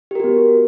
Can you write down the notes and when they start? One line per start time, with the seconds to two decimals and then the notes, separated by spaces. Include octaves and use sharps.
0.11 G4
0.15 A#4
0.20 F#4
0.24 B3